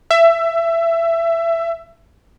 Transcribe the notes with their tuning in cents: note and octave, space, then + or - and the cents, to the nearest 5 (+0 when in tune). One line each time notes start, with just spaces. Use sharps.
E5 +20